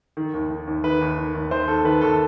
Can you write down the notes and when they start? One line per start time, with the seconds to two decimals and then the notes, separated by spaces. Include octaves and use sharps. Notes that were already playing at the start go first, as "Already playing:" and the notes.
0.17 D#3
0.34 D#2
0.50 D#3
0.67 D#2
0.84 D#3 B4
1.01 D#2
1.18 D#3
1.34 D#2
1.51 D#3 C5
1.68 D#2 A4
1.85 D#3 B4
2.01 D#2 A4